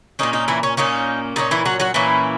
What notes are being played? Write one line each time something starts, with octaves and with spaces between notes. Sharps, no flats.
A#2 A#3 C#4 D#4
D#4
E3 E4
C#4
A#2 A#3 C#4 D#4
A#2 A#3 C#4 D#4
E3 E4
F#3 F#4
F#3 F#4
A#2 E3 A#3 C#4 E4